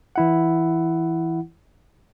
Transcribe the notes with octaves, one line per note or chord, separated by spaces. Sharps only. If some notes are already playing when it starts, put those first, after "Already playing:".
E3 E4 F#5